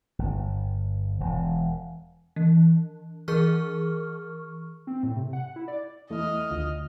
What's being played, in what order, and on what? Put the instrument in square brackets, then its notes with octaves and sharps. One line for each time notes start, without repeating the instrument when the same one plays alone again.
[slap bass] G1
E1
[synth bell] E3
E3 G#4 A#4 C#6 F6
[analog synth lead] C4
A2
C3
F#5
E4
D5
[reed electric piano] E2 A3 E4 [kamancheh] D#5 F6
[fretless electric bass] D2 [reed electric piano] F4